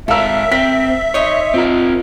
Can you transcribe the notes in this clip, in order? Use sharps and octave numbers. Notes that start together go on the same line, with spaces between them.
G#2 A4 A#4 E5 F5 E6
C4 A#4 B6
D#4 C#5 D#5 C6
C4 F4 A#4